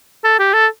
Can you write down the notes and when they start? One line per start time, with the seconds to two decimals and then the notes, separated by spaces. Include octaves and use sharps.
0.24 A4
0.39 G4
0.54 A4